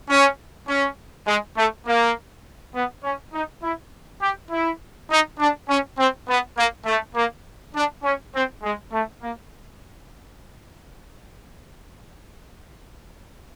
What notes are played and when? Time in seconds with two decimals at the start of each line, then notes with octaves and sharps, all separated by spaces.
0.08 C#4
0.67 C#4
1.26 G#3
1.56 A3
1.85 A#3
2.74 B3
3.03 C#4
3.32 D#4
3.62 E4
4.21 G4
4.51 E4
5.10 D#4
5.39 D4
5.68 C#4
5.98 C4
6.27 B3
6.56 A#3
6.86 A3
7.15 A#3
7.75 D4
8.03 C#4
8.34 C4
8.63 G#3
8.92 A3
9.22 A#3